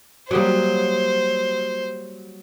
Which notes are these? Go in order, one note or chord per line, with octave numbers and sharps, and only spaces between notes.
F#3 G3 A#3 G4 C5 D#6